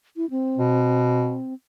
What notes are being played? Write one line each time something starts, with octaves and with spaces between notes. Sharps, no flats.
E4
C4
B2